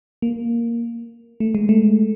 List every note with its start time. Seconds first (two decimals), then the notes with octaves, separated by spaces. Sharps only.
0.22 A#3
1.40 A3
1.55 G#3
1.69 A3